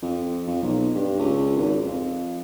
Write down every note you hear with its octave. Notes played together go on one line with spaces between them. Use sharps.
F2
F2
B1
G2
C#2
G#1
F2